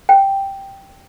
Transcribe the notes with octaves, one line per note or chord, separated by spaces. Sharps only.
G5